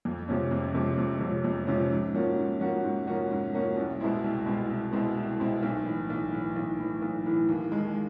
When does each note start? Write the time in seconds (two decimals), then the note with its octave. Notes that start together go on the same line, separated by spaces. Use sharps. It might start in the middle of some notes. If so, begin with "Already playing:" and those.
0.05 F2
0.28 C3 F3 G#3 C#4
0.51 F2
0.74 C3 F3 G#3 C#4
0.98 F2
1.20 C3 F3 G#3 C#4
1.44 F2
1.67 C3 F3 G#3 C#4
1.91 G#2
2.14 F3 A#3 C#4 F#4
2.37 G#2
2.60 F3 A#3 C#4 F#4
2.83 G#2
3.07 F3 A#3 C#4 F#4
3.31 G#2
3.53 F3 A#3 C#4 F#4
3.76 C2
4.00 B2 G#3 C4 E4
4.24 C2
4.46 B2 G#3 C4 E4
4.70 C2
4.93 B2 G#3 C4 E4
5.17 C2
5.40 B2 G#3 C4 E4
5.63 B1
5.85 A2 E3
6.10 B1
6.33 A2 E3
6.56 B1
6.79 A2 E3
7.02 B1
7.26 A2 E3
7.49 D#2
7.72 D#3 G#3